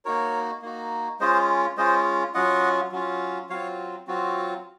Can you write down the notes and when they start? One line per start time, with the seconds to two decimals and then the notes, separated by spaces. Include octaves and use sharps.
0.05 A#3 D#4 F#4 A#4 C#5
0.62 A#3 D#4 F#4
1.20 G#3 C#4 F4 C5 D#5
1.77 G#3 C#4 F4 C5 D#5
2.34 F#3 C#4 F4 D#5 F#5
2.92 F#3 C#4 F4
3.50 F#3 C4 F4 C#5 F5
4.07 F#3 C4 F4 F#4